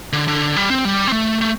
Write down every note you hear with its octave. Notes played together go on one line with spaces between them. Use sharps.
D3
D3
G3
C4
G3
C4
A3
A3